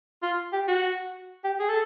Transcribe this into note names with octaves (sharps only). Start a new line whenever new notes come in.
F4
G4
F#4
G4
G#4
A4